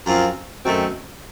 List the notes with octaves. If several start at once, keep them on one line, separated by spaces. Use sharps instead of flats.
F#2 F3 C4 F4
F#2 D#3 A3 C4 F#4